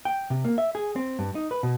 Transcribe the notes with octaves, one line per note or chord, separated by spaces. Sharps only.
G5
C3
A#3
E5
G#4
C4
G2
D#4
B4
B2